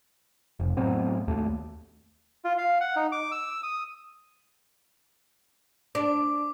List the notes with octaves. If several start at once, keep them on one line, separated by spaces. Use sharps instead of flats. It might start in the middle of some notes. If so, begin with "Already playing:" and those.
F1
A2 F#3 B3 C4
D#2 A3
F4
F5
F#5
D#4
D6
E6
D#6
D4 D6